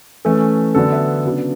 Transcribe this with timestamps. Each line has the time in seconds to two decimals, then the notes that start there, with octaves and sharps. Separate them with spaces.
0.25 E3 A3 C#4 A4
0.75 D3 F#3 B3 D4 A4
0.92 E5
1.24 C#3 F#3 B3 D4